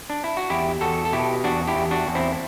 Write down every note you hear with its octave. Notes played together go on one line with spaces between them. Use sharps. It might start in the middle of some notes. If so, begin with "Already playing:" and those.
D4
E4
F#4
E2 E4 G4
E2 F#4 A4
A4
B2 E4 G4
E2 D4 F#4
E4 G4
E2
D4 F#4
E2
C4 E4